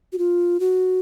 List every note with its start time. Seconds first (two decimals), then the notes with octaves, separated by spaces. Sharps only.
0.13 F#4
0.18 F4
0.60 F#4